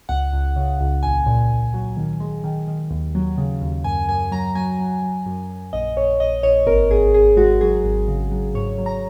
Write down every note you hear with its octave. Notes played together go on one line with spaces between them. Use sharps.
C#2 F#5
C#2
C#3
C#2
A#1 G#5
A#2
A#1
F#3
D#3
G#3
D#3
D#3
D#2
F#3
C#3
D#2
F#2 G#5
F#2 G#5
F#3 A#5
F#3 G#5
F#3
F#3
F#2
F#2
A#1 D#5
A#1 C#5
A#1 D#5
A#1 C#5
G#1 A#4
G#1 G#4
G#1 G#4
G#3 F#4
F#3 G#4
G#1
C#3
F#3
G#2 C#5
F#3
A#5